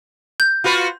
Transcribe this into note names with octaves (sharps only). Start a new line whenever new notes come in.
G6
F4 F#4 B4